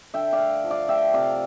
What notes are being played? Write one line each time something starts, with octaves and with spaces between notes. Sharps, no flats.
D3 E5 G5
D5 F5
A3
F3
D5 F5
A3 E5 G5
C3 D5 F5